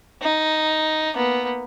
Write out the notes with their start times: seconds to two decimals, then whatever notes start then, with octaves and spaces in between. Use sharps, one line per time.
0.22 D#4
1.14 A#3 B3